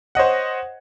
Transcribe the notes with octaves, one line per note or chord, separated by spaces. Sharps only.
C5 C#5 D#5 F#5